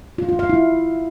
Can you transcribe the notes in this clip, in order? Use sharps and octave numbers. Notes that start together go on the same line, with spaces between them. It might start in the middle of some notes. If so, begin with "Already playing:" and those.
F4
F4
F5
E4